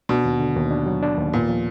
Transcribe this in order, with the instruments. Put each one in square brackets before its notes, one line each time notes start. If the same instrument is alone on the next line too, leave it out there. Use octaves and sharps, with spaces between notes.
[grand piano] B2 [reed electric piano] D4
[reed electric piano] D#2
D3
D#2
D4
F#3
D4
D#2
[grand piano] A#2 [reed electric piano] B3
[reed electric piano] F3